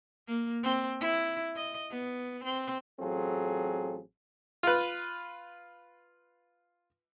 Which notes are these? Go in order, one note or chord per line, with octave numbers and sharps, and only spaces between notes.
A#3
C4
E4
D#5
B3
C4
A1 F#3 C4 F4 G#4 A4
F4 B4